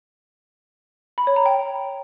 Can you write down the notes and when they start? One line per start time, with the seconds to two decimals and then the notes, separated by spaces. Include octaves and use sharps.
1.18 B5
1.27 C#5
1.36 A#5
1.46 G5